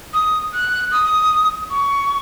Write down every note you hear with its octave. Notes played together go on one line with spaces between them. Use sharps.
D#6
F#6
D#6
C#6